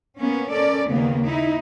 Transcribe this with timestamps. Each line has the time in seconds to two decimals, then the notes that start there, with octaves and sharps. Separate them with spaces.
0.18 A#3 B3 C#4
0.49 C#4 A4 A#4 D5
0.87 D#2 C#3 A#3 B3
1.25 D#4 E4